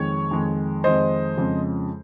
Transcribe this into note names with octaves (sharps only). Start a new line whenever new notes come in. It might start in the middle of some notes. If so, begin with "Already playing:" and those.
Already playing: F2 D#3 G#3 C#5
F2 D#3 G#3
F2 D#3 G#3 C5 D#5
F2 C#3 F3 G#3